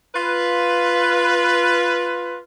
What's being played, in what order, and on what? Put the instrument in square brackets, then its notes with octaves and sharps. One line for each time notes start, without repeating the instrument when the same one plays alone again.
[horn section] F4 B4